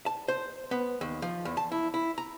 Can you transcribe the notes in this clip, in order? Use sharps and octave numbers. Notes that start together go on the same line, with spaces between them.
A5
C5
B3
D#2
F3
E2
A5
E4
E4
A#5